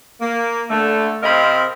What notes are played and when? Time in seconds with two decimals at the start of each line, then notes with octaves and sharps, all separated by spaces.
0.21 A#3
0.70 D3 A3
1.23 C3 C4 A#4 D#5 F5 B5